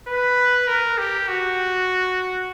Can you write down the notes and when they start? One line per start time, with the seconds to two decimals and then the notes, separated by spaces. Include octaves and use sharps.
0.08 B4
0.68 A#4
0.98 G4
1.28 F#4